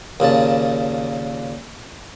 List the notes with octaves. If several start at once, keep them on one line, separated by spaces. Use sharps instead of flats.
D#2 A#2 C#3 A5